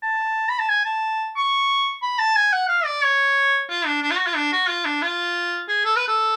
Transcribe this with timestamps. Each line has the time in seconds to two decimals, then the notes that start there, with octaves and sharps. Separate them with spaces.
0.03 A5
0.49 B5
0.59 A5
0.69 G#5
0.85 A5
1.36 C#6
2.03 B5
2.19 A5
2.36 G#5
2.53 F#5
2.69 F5
2.85 D5
3.03 C#5
3.69 F4
3.86 D4
4.03 D4
4.11 F4
4.18 F#4
4.27 F4
4.36 D4
4.52 F#4
4.68 F4
4.85 D4
5.02 F4
5.69 G#4
5.85 A4
5.96 B4
6.08 A4